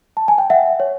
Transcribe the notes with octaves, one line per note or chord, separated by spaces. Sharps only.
A5
G#5
G5
E5 F#5
C#5